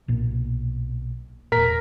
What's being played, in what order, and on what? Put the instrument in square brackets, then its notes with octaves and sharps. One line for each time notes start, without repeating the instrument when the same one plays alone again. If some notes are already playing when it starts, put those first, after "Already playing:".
[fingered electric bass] B1 A#2
[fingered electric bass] E1 A#2 [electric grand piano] A#4 A#5 B6